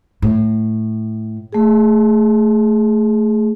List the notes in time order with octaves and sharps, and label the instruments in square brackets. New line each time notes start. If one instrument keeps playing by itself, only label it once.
[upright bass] A2
[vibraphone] A3 G#4